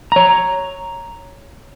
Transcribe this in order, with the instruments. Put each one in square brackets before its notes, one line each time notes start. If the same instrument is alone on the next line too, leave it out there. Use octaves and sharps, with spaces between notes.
[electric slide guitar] C#5 A#5